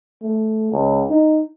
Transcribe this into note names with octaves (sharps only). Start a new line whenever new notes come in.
A3
C#2
D#4